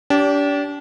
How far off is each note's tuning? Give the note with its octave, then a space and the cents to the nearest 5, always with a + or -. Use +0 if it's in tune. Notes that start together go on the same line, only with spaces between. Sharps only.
D4 -35 G4 -15